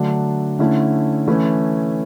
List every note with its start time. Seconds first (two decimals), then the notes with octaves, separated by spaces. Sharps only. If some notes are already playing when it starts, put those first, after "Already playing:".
Already playing: D3 F#3 A3 D4
0.59 D3 A3 C#4 E4
1.28 E3 A3 C#4 E4